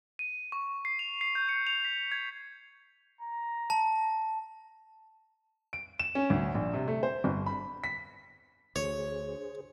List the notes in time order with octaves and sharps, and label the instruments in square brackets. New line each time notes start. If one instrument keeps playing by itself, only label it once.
[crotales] D#7
C#6
C7
F7
C7
G6
C#7
F7
B6
G#6
[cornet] A#5
[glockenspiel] A5
[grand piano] D7
E7
C#4
D2
A#1
C3
A3
C5
G1
B5
B6
[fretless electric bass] D2 [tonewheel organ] G#4 C5 [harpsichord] C#5